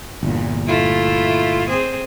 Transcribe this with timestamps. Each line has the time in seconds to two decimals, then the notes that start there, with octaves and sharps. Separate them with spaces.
0.23 G1 E2 A#2
0.68 A3 E4 F4
1.69 C4 G#4 C5